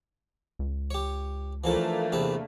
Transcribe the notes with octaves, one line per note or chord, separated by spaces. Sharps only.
C#2
G4 C#5
E3 F3 A3 A#3 D4 A4
E2 C3 B4